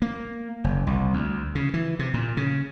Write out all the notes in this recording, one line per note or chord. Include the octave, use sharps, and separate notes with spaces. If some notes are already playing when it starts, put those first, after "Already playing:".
A#3
F#1
C2
D2
C#3
E3
C3
A#2
C#3